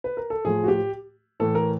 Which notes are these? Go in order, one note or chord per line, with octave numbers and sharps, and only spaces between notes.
B4
A#4
A4
A2 F3 A3 G#4
F#4
G4
A2 E3 A3 A4
A#4